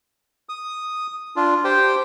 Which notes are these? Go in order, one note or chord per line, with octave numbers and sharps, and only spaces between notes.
D#6
D4 F4
G4 C5 G5